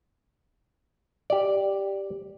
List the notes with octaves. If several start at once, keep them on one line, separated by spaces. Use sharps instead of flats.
G4 D5